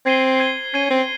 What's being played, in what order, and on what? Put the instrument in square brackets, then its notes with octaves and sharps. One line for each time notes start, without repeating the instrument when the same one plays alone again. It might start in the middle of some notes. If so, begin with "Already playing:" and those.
[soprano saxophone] C4 [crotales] G#6 C7 D#7 G7
[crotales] G#6 C7 D#7 G7
[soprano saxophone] C#4 [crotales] G#6 C7 D#7 G7
[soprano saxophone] C4